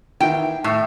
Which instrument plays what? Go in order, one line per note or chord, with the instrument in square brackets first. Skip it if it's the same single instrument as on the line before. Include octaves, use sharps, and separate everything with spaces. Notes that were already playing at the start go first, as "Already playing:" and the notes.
[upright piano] D#3 E3 E4 [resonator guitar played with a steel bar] G5
[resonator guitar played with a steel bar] A2 [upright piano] E5 C#6